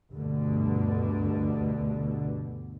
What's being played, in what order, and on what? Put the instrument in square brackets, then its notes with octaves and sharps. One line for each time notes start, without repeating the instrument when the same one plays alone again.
[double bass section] D2 G2 B2 D3